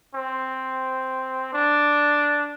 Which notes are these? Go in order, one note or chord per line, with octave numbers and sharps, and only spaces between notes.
C4
D4